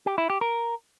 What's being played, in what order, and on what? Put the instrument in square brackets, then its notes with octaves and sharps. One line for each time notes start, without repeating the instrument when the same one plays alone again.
[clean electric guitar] G4
E4
G4
A#4